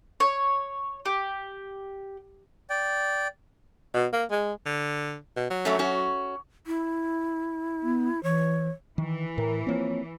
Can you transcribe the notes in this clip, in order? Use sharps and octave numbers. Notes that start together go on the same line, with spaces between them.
C#5
G4
D5 G5
B2
A#3
G#3
D3
B2
F#3
F#2 A3 C#4
C#4 F#4
E4
B3
E3 C#5
D#3 E3
A2 A#4
F3 A#3 C4 C#5